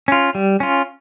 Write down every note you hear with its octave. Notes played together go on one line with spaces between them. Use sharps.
C#4 F4
G3
C#4 F4